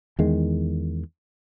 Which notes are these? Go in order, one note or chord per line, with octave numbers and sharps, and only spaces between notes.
E2 D#3 G#3